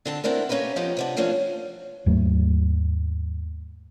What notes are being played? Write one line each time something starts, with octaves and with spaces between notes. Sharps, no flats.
D3 C4 A5
B3 C4 D4 E4 A#4
A#3 C#4 G4 A#4 B4
F3 B3 D#4 G4 C#5
C3 B3 D4
E3 F3 A#3 C#4 D4
D#2 G#2 F#3 A3